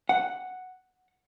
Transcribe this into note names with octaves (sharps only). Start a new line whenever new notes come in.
F#5